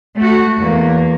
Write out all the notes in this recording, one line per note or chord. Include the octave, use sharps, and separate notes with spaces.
A3 F#4
E2 A#3